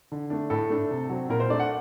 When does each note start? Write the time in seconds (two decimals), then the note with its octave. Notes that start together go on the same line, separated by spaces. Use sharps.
0.12 D3
0.30 A3 D4
0.50 A2 A4
0.70 A3 D4
0.91 C3
1.09 F#3 C4
1.29 A#2 A#4
1.40 C5
1.49 A3 D4 D5
1.59 F#5